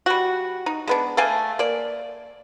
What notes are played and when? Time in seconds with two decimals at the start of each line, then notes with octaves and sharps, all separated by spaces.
0.06 G3 F#4
0.66 D#4
0.87 G#3 B3 D4
1.17 A3 D5 F5 G#5
1.59 A#3 D5